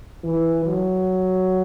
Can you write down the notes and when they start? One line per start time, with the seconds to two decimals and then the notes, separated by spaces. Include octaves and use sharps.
0.24 E3
0.65 F#3